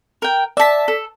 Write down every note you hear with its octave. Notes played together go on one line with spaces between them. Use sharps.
A#4 G5
D5 E5 A5 B6
A4